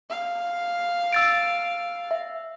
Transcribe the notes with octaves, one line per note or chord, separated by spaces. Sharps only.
F5
E6 A6 D7
E5